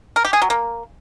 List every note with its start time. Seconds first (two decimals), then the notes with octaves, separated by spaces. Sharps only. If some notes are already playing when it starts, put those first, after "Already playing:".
0.16 A#4
0.25 G4
0.33 G#4
0.42 F#3
0.50 A#3